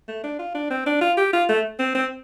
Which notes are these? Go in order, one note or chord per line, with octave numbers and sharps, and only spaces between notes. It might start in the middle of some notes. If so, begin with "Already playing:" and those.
A3
D4
F4
D4
C4
D4
F4
G4
F4
A3
C4
C4